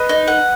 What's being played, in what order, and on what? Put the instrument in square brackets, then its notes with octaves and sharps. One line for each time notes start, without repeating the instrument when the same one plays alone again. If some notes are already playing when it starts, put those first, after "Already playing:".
Already playing: [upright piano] B4 D#5
[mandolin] D#4
F#5